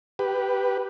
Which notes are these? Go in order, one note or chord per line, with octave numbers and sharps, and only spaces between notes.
G4 B4